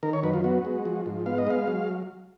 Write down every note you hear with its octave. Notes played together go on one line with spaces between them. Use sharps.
D#3 A#4
C#5
F#2 B4
F4
B3 F#4
G#3
F3
G#2
B3 F5
D#5
G#3 F5
F#3